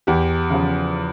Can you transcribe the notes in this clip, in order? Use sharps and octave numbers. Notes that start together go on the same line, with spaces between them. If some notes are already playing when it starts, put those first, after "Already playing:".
E2 G4
C#3 F3